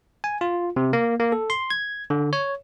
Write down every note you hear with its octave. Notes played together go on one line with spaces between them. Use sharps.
G#5
F4
C3
A#3
A#3
A4
C6
G#6
D3
C#5